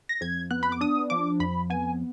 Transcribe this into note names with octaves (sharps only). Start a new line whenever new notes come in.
A#6
F2 G#6
B3 F#6
B5
D6
D4 D#6
F3 D6
F2 B5
B3 G#5